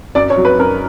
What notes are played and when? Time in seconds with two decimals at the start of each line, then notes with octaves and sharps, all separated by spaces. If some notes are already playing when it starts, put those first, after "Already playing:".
0.15 F#2 D5
0.30 C#5
0.37 F#3
0.45 B4
0.59 F#2 A#4